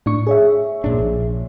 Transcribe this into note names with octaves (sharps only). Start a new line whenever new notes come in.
A2 D4 C#6
G#4 C#5 E5
B1 A#2 D4
A#1